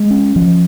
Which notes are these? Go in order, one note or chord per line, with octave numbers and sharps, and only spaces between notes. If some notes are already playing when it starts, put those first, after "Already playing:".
Already playing: G#3
C#4
F3